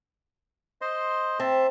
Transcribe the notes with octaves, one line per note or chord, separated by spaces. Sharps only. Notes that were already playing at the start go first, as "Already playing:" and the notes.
C5 D#5 C6
C4 E5 A5 C6